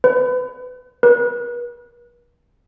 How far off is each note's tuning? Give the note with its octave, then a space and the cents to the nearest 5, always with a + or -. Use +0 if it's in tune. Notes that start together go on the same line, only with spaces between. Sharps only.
B4 +30
B4 -45